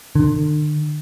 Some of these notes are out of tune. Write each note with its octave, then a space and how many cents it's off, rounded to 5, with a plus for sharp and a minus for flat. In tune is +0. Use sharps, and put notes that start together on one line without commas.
D3 +40